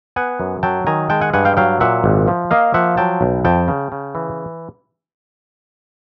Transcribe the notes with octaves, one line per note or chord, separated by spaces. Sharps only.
B3 F#5 G#5
F#2
F#3 G5 A5
D#3 G#5 A#5
G#3 G5 A5
F#5 G#5
G2 F#5 G#5
F5 G5
F#3 F5 G5
A#2 E5 F#5
G#1
F3
A#3 D#5 F5
F3 E5 F#5
F#3 G5 A5
B1
F2 G5 A5
C#3
C#3
E3